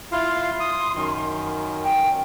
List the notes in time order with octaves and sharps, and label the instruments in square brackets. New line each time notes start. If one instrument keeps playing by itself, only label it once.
[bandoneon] E4 F4 F5 [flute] C6
[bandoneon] D#6
F#2 D#3
[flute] G5